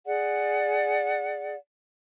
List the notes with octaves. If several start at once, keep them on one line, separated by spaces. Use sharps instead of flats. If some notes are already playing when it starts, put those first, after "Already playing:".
G#4 D5 F#5